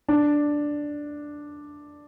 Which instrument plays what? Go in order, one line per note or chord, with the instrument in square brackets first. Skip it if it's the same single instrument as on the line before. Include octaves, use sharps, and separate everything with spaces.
[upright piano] D4